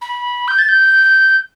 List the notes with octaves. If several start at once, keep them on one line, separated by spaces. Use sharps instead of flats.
B5
G6
A6
G6